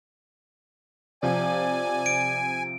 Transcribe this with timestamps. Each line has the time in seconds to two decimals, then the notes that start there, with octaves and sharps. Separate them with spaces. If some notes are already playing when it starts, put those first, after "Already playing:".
1.23 C3 F3 D5 G#5
2.06 D7